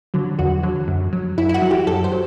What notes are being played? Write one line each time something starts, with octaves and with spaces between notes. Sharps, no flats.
D3 F#3
E2 F#4
D3 F#3
F#2
F#3
F#2 E4
E4
F#4
F#3
G4
F#2 A4
C5
F#3